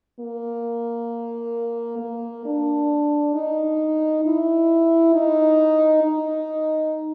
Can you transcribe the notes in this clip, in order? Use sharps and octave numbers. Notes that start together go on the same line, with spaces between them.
A#3
A#3
D4
D#4
E4
D#4
D#4